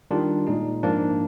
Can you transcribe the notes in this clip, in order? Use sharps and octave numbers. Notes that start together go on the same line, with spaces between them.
D#3 G3 D4 F4
A#2 G#3 D#4
G#2 F3 A#3 D4